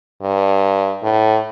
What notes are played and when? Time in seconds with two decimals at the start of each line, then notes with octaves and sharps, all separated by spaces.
0.22 G2
1.03 A2